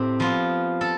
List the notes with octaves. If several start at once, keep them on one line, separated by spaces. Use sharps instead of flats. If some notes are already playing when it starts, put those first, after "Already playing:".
Already playing: A2 C4 G4
F3 B3 F4
A4